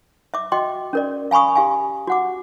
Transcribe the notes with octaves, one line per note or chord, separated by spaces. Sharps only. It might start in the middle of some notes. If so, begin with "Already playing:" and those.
E5 D6
F#4 D#5 G5 C6 D6
C#4 A#4 D5
F5 G#5 B5 C#6 D#6
G4 F5 G#5
F#4 F#5 D6